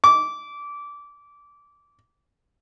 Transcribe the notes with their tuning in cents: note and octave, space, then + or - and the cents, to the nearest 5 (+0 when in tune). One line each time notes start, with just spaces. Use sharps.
D6 -20